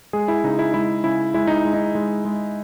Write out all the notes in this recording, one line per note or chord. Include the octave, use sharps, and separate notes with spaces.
G#3 G#4
E4
C#3 D#4
E4
G#3 E4
C#3 E4
G#3 E4
D#4
G#3
D#4
G#3
G#3